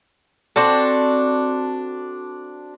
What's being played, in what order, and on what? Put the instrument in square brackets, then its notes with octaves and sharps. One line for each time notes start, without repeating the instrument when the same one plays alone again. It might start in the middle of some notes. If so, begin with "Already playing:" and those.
[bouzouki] C4 D4 F#4 A4